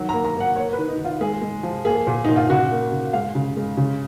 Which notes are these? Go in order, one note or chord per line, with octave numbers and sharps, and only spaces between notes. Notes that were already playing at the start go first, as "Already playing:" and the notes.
Already playing: D#3 F#3
A#5
A#3
A#5
A#3
F#5
A#3 C#5
B4
D#3
D#4
D#3
F4
G#3 G#4
G#3
F3
A#3 G#4
A#2
A#2 D#4
F4
C#3 F#4
A#3
C#3
G#3 F5
C#3
G#3
C#3